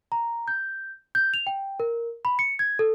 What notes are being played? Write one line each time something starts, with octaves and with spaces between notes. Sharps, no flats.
A#5
G6
G6
F7
G5
A#4
B5
C#7
G#6
A4